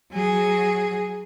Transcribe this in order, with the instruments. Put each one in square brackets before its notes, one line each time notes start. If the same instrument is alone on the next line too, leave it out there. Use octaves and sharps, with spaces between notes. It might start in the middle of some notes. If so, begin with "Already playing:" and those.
[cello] F#3 G#4